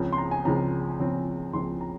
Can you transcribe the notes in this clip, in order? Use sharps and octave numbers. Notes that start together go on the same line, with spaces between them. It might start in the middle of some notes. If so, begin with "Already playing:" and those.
Already playing: C#2 C#3 F3 C4
C6
A#5
G#5
C#2 C#3 F3 C4 A#5
C#2 C#3 F3 C4
C#2 C#3 F3 C4 C6
A#5